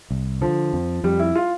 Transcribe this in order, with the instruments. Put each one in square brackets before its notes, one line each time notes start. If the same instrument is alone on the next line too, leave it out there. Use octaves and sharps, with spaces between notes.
[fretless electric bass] C2
[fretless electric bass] D3 [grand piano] F3
[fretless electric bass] F2
[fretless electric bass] F2 [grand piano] G3
[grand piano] E4
F4